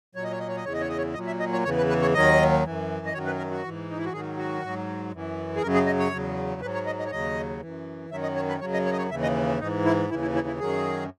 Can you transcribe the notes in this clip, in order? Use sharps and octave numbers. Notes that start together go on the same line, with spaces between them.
A#2 F#3 C#5
D#5
C#5
D#5
C#5
D#5
E2 C#3 E3 C#5
D#5
C#5
D#5
C#5
A#2 F#3 D#5
E5
D#5
C#5
E2 C#3 E3 C#5
B4
B4
C#5
D#2 D#3 F#3 D#5
F#2 E3
D#5
F#2 D#3 F#3 C#5
B4
A#4
F#4
G#2 E3
D#4
E4
F#4
G#2 D#3 F#3 G#4
F#4
G#2 F#3
F#2 E3
G#4
F#2 C#3 F#3 A#4
G#4
D#5
C#5
E2 C#3 F#3
G#2 F#3 B4
C#5
D#5
D#5
C#5
D#2 C#3 F#3 D#5
F#2 E3
F#2 D#3 F#3 E5
D#5
C#5
B4
F#2 C#3 F#3 C#5
D#5
C#5
D#5
C#5
D#2 C#3 E3 E5
D#5
G#2 E3 D#4
E4
D#2 C#3 E3 E4
E4
E4
E4
F#2 D#3 F#3 G#4